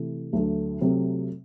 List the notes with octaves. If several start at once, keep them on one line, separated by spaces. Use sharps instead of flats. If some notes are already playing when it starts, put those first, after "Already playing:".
Already playing: C3 E3 A3
D2 D3 F#3 A3
C3 F#3 A3 C4